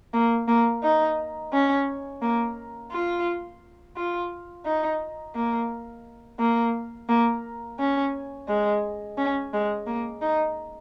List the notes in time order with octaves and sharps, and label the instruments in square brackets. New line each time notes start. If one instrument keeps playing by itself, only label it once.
[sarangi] A#3
A#3
D#4
C#4
A#3
F4
F4
D#4
A#3
A#3
A#3
C#4
G#3
C#4
G#3
A#3
D#4